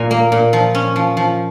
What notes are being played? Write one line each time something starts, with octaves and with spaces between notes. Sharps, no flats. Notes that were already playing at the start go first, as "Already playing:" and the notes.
Already playing: A#2 G#5 A#5
A#3
A#2
F3
C#4
F3
F3